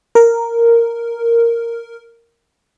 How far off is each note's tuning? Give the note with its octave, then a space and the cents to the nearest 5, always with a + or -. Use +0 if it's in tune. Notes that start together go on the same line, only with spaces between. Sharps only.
A#4 -5